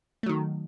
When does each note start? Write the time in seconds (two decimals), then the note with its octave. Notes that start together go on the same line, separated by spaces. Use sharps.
0.23 A3
0.26 F#3
0.29 D#3